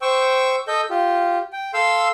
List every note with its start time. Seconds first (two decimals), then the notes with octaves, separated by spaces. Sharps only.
0.02 C5 G5 C#6 E6
0.68 A4 D#5 G6
0.90 F4 G4
1.53 G5
1.74 A4 F5 C6 E6